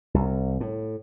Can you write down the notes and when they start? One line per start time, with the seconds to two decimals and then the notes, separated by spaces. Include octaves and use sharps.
0.14 C2
0.60 A2